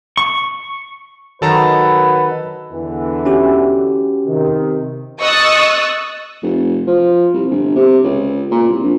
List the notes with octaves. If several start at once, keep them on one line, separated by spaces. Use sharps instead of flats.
C#6
D#3 F#3 A4 B4 A5 A#5
E2 D3 E3
C#4 F#4 G4
C3 D#3
D#5 C#6 D#6 E6 F#6 A6
F1
F3
C2
G1
C3
C#2
A#2
C2
A#1